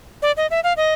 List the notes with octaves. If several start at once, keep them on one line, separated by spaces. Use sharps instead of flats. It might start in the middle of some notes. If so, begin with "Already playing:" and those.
D5
D#5
E5
F5
D#5